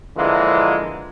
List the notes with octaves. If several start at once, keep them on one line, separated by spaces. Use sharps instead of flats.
D3 E3 F3 G#3 A#3 F4